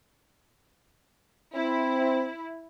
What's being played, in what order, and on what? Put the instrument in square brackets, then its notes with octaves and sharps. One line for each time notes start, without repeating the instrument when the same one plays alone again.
[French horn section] C4 [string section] E4